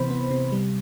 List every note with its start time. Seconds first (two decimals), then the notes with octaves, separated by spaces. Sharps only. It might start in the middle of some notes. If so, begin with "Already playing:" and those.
Already playing: C3 E3 B3 C5 B5
0.10 B3
0.31 C3
0.52 G3